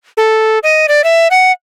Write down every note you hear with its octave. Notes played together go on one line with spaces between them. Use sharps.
A4
D#5
D5
E5
F#5